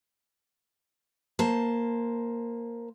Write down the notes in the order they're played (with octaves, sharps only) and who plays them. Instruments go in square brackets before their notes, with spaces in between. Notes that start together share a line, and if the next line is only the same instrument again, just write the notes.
[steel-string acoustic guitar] A#3 C5 A5